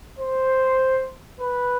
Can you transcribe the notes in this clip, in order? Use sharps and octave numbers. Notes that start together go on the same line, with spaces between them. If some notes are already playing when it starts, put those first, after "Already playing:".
C5
B4